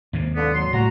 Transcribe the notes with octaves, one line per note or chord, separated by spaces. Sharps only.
D#2 G#2 C3
D3 A#3 B3
F#3 C6
D1 A2 G3 F#4 A#5